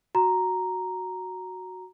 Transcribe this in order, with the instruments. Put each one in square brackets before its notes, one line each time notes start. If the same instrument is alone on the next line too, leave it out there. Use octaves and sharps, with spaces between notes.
[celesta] F#4 A#5